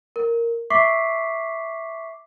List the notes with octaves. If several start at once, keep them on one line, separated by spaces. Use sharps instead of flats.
A#4
E5 C#6 D6 B6 C7